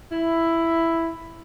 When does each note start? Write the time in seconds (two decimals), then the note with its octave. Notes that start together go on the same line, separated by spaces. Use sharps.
0.12 E4